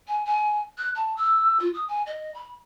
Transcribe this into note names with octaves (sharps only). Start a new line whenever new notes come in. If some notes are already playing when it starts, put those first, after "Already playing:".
G#5
G#5
F#6
A5
E6
F4
D#6
G#5
D#5
B5